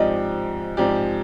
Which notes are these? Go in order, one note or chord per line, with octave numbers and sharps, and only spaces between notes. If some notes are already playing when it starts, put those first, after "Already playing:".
Already playing: G#2 F3 C4 G4 D5 D#5
G#2 F3 C4 G4 D5